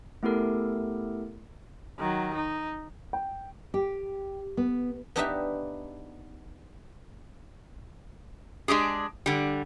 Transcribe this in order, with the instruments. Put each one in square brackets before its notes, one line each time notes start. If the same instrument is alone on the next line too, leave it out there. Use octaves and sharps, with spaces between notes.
[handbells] A3 B3 E4 G4 A4 A#4
[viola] D#3 F#3
D#4
[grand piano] G5
[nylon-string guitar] G4
B3
[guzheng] B3 D4 D#4 G4 B4 E5
[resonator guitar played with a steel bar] G#3 D4 G4 G#4
D3 G3